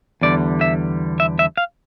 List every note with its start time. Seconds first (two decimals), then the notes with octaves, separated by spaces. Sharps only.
0.21 E2 D3 G3 D5
0.61 E5
1.20 E5
1.39 E5
1.57 F5